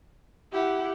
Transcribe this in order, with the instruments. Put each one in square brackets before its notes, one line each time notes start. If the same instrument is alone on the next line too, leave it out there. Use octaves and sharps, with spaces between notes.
[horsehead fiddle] E4 F#5 [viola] G4